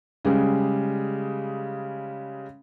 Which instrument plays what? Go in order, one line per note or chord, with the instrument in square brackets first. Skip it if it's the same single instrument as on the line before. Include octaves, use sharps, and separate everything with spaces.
[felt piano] C#3 G3 G#3